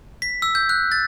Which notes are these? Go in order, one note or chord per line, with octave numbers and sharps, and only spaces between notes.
B6
E6
G6
F#6
A6